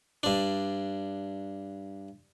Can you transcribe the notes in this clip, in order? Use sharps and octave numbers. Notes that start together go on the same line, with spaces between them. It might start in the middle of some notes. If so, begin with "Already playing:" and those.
G2 D4